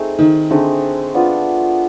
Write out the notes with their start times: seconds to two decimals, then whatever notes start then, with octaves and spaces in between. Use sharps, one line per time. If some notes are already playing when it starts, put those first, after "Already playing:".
Already playing: A3 C4 D#4 G#4
0.19 D#3
0.50 D3 A3 C4 D#4 G#4
1.14 B3 D4 F4